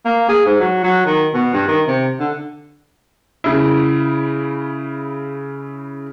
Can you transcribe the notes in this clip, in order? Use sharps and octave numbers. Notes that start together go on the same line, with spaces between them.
A#3
G#4
G#2
F#3
F#3
D#3
B2
G2
D#3
C3
D3
C#3 E4